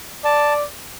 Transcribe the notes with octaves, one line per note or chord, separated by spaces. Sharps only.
D5 A5